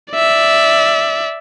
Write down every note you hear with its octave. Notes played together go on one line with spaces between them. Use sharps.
D5 E5